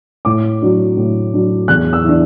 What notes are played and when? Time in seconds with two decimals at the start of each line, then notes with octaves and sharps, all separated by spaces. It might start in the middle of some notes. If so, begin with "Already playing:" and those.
0.25 A2 D6
0.62 F#3 D4
0.97 A2
1.33 F#3 D4
1.68 E2 F#6
1.93 E6
2.04 E3 D4